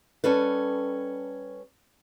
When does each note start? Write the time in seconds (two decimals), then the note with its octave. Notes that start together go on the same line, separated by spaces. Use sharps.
0.24 G3 C#4 A4 B4